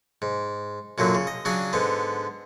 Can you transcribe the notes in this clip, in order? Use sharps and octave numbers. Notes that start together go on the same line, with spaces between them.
G#2
F#2 A#2 D3 F#3
C#3
D#5
C#3 F#3 D4 G#4
G#2 D3 B3